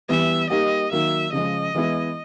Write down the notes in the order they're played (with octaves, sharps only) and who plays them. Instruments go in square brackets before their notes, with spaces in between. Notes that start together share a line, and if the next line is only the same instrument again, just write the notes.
[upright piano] E3 G3 B3 [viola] E5
[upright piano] G3 A#3 D#4 G4 [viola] D#5
[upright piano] D#3 F#3 A#3 [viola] E5
[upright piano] C#3 F3 G#3 [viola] D#5
[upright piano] E3 G#3 B3 E4